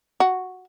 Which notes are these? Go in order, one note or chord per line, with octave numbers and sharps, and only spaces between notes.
F#4